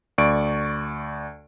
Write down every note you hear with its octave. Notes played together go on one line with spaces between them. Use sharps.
D2 D5 C#6 D7